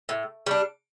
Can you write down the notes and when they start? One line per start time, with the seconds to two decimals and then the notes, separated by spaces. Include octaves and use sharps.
0.09 A2
0.46 G3 D4